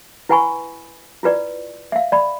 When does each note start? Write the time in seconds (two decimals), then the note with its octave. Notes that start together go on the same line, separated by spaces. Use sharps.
0.29 E4 B4 F#5 G#5 B5 C#6
1.23 E4 F4 B4 D5
1.92 E5 F5
2.12 D5 B5